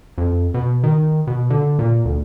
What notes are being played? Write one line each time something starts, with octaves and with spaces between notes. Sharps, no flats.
F2
B2
D#3
B2
D3
A#2
D2